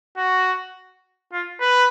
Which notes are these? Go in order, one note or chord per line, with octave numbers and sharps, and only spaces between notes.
F#4
F4
B4